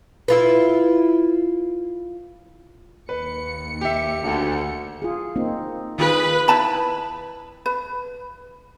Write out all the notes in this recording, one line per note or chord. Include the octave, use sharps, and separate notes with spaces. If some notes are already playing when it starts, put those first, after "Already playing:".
E4 F4 B4
D#2 B4 C#7
G4 E5
D2
F4 G#4
A#3 C4 D#4
D#3 F4 G#4 B4
E4 B4 A5 B5
B4